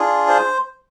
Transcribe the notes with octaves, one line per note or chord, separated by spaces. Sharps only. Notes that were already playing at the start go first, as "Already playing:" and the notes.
Already playing: D4 F4 G#4
C5